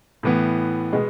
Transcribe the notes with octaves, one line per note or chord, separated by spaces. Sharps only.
A2 E3 B3
B2 G#3 B3